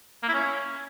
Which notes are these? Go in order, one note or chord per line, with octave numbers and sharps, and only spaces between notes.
A#3
E4
C#4